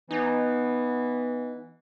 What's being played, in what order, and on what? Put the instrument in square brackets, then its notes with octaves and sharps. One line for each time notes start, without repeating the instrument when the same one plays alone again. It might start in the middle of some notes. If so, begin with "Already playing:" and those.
[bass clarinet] E3 [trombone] B3 [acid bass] D#4